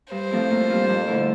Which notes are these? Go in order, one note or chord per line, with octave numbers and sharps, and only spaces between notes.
G2 C5
F3 A3 C4 E4
A#2
G3 D4 F4
F2
D3 A3 E4